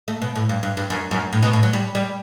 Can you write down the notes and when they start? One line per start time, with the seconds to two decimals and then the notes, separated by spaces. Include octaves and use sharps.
0.08 A3
0.22 B2
0.36 A2
0.49 G2
0.63 G2
0.77 G2
0.90 F#2
1.11 F#2
1.33 A2
1.43 B2
1.53 A2
1.63 F#3
1.73 G3
1.95 G3